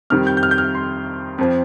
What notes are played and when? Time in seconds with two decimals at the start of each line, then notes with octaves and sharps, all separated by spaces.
0.10 F2 D#3 G3 F6
0.27 G6
0.37 G6
0.43 F6
0.51 G6
0.58 F6
0.75 C6
1.38 F2 F3